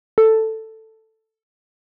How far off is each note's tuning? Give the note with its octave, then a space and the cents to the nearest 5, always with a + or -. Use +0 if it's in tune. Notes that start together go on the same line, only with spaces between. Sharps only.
A4 +5